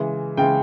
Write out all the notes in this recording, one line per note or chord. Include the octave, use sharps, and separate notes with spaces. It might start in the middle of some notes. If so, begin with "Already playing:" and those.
Already playing: C#3 E3 G#3
C#3 E3 G#3 G5